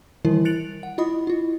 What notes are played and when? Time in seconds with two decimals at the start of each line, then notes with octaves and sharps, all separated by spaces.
0.25 D#3 E3 G3 E4 A#4
0.45 F#6 A6 C#7 D7 F7 F#7
0.83 F#5
0.98 E4 F4 D#5 B5 D#6
1.27 E4 F4